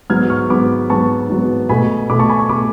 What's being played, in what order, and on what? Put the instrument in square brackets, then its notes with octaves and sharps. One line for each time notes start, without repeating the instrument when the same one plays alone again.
[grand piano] G#2 F#3 B3 F6 G#6
C#6 F6
G#2 F#3 B3 B5 D6
G#2 F#3 B3 A5 C#6
G#2 F#3 B3
B2 A3 G#5 B5
B2 A3 B5 D6
A5 C#6
G#5 B5
A5 C#6
B2 A3 B5 D6